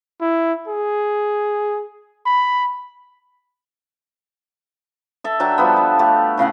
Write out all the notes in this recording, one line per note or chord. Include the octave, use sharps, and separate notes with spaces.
E4
G#4
B5
A4 E5
F#3 D4 G5 A5
F3 G3 B3
A5
A3 G4
A2 C#3 F5 F#5